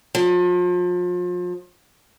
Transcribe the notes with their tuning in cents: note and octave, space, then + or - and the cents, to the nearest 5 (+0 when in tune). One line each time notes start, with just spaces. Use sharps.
F3 +35